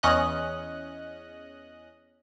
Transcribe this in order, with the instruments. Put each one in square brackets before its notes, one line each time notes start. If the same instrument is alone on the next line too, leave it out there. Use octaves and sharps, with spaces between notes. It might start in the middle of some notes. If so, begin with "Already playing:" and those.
[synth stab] E2 C#4 D#5 F#6